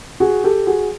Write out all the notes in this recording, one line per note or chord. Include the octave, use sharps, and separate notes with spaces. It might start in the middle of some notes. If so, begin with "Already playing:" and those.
F#4 G#4
G4 A4
F#4 G#4